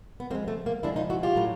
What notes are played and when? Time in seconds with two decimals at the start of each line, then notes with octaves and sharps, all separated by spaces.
0.20 B3
0.30 C#3 F3 G#3 A#3 C4
0.48 A3
0.66 A#3
0.83 C#3 F3 G#3 D4 E4
0.96 D#4 F4
1.10 E4 F#4
1.23 F4 G4
1.36 A2 F#3